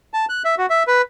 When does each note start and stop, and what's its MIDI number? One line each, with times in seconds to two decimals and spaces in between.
0.14 0.25 81
0.29 0.43 90
0.45 0.55 76
0.58 0.66 66
0.70 0.83 76
0.87 1.02 71